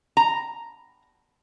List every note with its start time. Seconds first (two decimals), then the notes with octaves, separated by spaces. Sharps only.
0.17 A#5